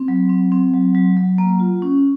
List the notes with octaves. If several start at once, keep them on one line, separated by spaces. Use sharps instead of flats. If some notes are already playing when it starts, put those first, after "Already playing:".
Already playing: C4
F#3
C4
C4
F#3
F#3
F#3
A#3
F4
C#4